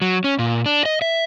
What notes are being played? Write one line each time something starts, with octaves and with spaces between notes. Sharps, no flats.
F#3
C#4
A#2
D4
D#5
E5